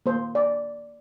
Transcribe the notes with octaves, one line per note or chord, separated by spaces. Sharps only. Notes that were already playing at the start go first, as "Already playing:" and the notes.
A#3 C5
D5